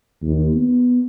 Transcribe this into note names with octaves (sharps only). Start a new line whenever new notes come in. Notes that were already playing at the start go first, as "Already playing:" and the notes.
D#2
B3